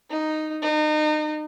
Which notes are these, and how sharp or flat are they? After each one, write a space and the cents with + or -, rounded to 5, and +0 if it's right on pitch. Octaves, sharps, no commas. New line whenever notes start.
D#4 -5
D#4 -30